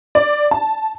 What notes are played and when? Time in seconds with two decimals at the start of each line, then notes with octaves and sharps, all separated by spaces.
0.15 D5
0.51 A5